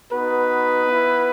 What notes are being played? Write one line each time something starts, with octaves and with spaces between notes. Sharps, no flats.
B3 D#4 F#4 B4
B3 E4